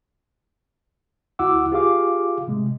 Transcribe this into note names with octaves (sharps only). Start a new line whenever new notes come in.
D2 E4 F#4 F#5 D6 E6
F4 G4 G#4 F5 D6
A2 C3 G#3